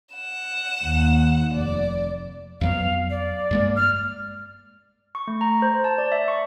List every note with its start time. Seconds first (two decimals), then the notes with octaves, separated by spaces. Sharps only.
0.14 F#5 E7
0.81 D#2
1.53 F1 D5
2.61 F2 F#3 B3 F5
3.10 D5
3.51 G2 G#3 A#3
3.76 F6
5.15 C#6
5.27 A3
5.41 A#5
5.62 C5
5.84 A5
5.98 D5
6.12 E5
6.28 C#6